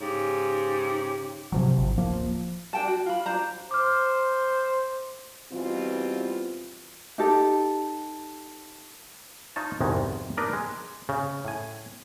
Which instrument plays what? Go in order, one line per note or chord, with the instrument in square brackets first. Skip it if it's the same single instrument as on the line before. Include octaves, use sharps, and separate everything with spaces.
[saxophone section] G#2 C#3 G4
[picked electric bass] C3 F3 F#3
G#1
D1 F3 A#3
[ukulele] D4 A4 G5 A5
F#4
F4 B5
D4 C5 A#5
[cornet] C5 [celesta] D6 F6
[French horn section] B2 E3 G3 C4 F4
[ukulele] D#4 G4 A4
[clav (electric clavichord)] D#4 F4 C#5 A5
C2 F2 G#2 B2 D#3 G#3
D4 D#4 A#4 B4 D5 D#5
G#3
C#3
A2 G#5